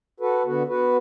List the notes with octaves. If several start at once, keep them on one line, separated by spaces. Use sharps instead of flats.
F#4 A4 B4
D3 B3 F#4
B3 F#4 B4